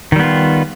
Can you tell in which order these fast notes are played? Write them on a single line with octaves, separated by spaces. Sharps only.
D#3 G3 B3 F4